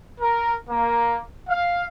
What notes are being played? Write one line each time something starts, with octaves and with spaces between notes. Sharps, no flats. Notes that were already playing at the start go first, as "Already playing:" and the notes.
A#4
A#3
F5